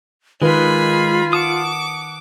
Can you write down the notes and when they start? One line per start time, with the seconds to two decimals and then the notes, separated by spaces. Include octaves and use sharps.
0.42 D#3 G#3 F4 B4 G#5 B5
1.33 F#5 A5 D6 D#6